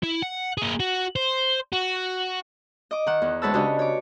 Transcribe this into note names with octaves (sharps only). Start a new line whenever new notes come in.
E4
F#5
A#3 G#4
F#4
C5
F#4
D#5 D6
D#3 F#5
E2
D2 G#3 B4 C#5 A5 E6
C#3 D4 F#4 G4 C#5 D#5
C#5 D6